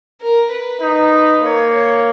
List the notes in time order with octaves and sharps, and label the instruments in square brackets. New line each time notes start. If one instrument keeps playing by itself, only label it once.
[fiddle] A#4
B4
[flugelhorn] D#4
[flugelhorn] A#3 [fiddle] C#5
[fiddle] C#5